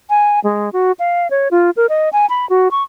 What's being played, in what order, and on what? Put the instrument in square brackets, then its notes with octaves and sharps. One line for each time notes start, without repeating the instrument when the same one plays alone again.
[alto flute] G#5
G#3
F#4
F5
C#5
F4
A#4
D#5
G#5
B5
F#4
C#6